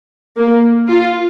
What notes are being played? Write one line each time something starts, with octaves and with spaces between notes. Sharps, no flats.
A#3
F4